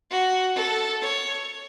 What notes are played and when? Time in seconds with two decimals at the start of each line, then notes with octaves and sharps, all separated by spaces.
0.10 F#4
0.56 A4
1.02 C#5